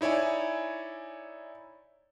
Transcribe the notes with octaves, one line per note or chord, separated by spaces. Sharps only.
D#4 E4 C#5 D5 G#5